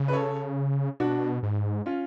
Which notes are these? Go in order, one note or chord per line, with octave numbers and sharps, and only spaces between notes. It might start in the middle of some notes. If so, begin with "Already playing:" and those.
Already playing: C#3
B4
A4 C#5
B2 D4 F#4
G#2
C#4 F4